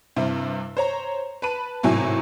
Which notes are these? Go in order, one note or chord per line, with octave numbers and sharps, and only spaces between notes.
G2 C3 E4
C5 C#5 A#5
B4 A5 B5 D#7
G#1 A2 C3 F#3 E4 G#5